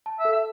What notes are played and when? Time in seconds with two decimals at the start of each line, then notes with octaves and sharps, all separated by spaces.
0.06 A5
0.19 E5
0.25 A4
0.32 E5